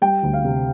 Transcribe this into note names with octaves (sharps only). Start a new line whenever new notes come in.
G3 G5
D2
F5
C3